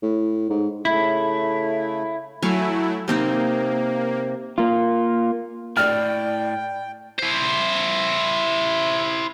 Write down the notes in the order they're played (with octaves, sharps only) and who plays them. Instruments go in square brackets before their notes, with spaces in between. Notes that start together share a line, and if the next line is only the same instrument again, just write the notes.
[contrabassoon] A2
G#2
[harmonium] C#3 A3 [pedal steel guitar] E4
[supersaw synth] F#3 A3 E4 [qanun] F5 G#5 C#6
[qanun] C3 C4 D#4 [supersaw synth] A#3
[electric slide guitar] A#3 F4
[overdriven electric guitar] A2 [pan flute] D5 [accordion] G5 [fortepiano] F6
[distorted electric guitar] E4 C5